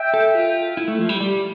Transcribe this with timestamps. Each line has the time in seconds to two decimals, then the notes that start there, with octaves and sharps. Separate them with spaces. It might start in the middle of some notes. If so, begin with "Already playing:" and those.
Already playing: E5 G5
0.14 A4
0.35 F4
0.77 E4
0.88 A3
0.99 F3
1.09 G3
1.20 G3